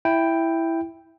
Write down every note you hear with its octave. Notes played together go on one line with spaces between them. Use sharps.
E4 G5